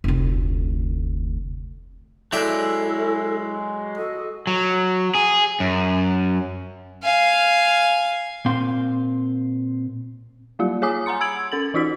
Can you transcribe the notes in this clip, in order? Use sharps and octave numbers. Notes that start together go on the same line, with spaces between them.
F1 D2
F#3 G#3 D4 E4 A4 E5 G5
F#4 A4 D#5
F#3
G#4
F#2
F5 G#5
A#2 C4 F5 C6
F#3 G3 A#3 F4
G#4 C#5 G#5 D6 D#6
F#5 G#5 A#5 C6 C#7
B5 E6 G#6 D7 F#7
C#4 A4 A6 F#7
E3 D#4 F4 F#4 B6